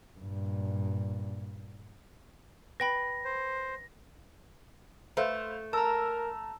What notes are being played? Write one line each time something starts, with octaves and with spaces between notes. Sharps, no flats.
G2 A#2
B4 G5 B5 A#6
C5
A3 B4 C5 F5
A#4 A5 A#5 E6